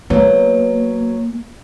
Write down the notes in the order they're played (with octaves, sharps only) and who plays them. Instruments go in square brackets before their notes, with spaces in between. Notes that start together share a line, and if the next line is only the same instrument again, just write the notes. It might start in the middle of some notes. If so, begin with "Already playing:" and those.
[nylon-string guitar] F#3 B3 [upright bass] A#3